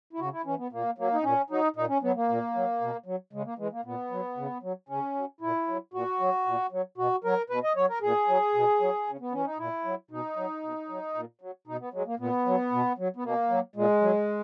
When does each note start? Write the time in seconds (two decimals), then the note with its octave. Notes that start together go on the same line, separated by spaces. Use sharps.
0.13 E4
0.20 C#3 F#4
0.33 E4
0.45 E3 C#4
0.58 B3
0.72 A#2 A#3
0.98 F#3 A#3
1.13 D#4
1.23 A#2 C#4
1.50 F#3 D#4
1.76 A#2 D#4
1.89 C#4
2.02 F#3 B3
2.15 A#3
2.29 A#2
2.55 F#3
2.81 B2
3.06 F#3
3.33 C#3 G#3
3.45 A#3
3.58 E3 G#3
3.72 A#3
3.85 A#2 B3
4.11 F#3
4.37 C#3
4.63 F#3
4.89 C#3 C#4
5.15 F#3
5.41 A#2 E4
5.68 F#3
5.94 A#2 F#4
6.20 F#3
6.46 A#2
6.72 F#3
6.98 B2 F#4
7.24 F#3 A#4
7.50 B2 B4
7.64 D#5
7.76 F#3 C#5
7.89 A#4
8.02 A#2 G#4
8.28 F#3
8.54 B2
8.80 F#3
9.07 C#3
9.20 B3
9.32 E3 C#4
9.45 D#4
9.58 A#2 E4
9.85 F#3
10.11 B2 D#4
10.36 F#3
10.63 B2
10.89 F#3
11.15 A#2
11.41 F#3
11.67 B2 D#4
11.80 B3
11.93 F#3 G#3
12.06 A#3
12.19 A#2 B3
12.46 F#3
12.72 B2
12.98 F#3
13.16 B3
13.23 B2 A#3
13.50 F#3
13.76 A#2 G#3
14.02 F#3